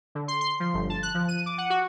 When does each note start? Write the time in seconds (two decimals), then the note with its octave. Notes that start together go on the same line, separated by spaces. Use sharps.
0.15 D3
0.28 C6
0.41 C6
0.60 F3
0.74 G1
0.90 A5
1.03 F#6
1.15 F3
1.28 D#7
1.46 D6
1.58 F#5
1.70 F#4